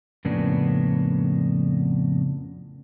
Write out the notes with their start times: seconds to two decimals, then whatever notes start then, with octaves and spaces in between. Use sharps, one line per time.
0.25 F2 A2 C#3 A#3 B3 D4